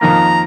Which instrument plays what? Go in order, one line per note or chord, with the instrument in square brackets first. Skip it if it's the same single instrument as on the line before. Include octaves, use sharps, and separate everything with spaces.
[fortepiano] F2 D#3 A#3 [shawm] A#5